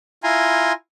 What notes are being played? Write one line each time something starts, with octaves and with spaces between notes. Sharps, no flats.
E4 F4 G#5 A#5 C6